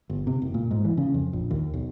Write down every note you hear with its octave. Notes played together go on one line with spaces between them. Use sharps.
G1
C3
F#1
A#2
G#2
E3
C#3
F2
A#1
D#2
B1